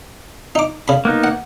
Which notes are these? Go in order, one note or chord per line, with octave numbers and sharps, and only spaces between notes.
D#4 D6
C#3 B5
A#3 B3 D#4
F#5